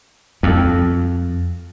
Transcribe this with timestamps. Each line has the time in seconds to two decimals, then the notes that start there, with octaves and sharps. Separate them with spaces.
0.43 F2